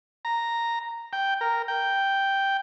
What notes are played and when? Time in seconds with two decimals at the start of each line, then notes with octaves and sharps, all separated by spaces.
0.25 A#5
1.13 G5
1.41 A#4
1.68 G5